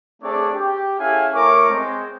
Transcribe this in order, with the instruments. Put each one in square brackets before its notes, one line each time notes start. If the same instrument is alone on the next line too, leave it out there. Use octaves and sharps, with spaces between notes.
[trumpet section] A3 C4 D4 G#4 C#5 D5
G4
C#4 E4 G#4 A4 F5 G#5
A3 E4 A#4 C#5 C#6 D6
G#3 C4